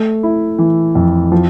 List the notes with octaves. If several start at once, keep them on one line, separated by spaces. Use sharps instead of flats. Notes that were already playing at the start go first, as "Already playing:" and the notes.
Already playing: A3
E4
E3
F2
F3